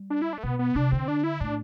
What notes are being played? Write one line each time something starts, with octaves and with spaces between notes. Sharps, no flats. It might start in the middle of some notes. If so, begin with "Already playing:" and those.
Already playing: G3
D4
E4
D4
A3
B2 B3
B3
C3 D4
D3 C4
D4
E4
A2 D4